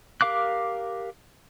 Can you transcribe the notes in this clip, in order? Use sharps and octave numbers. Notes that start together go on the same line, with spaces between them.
G4 A#4 F5 D6 F#6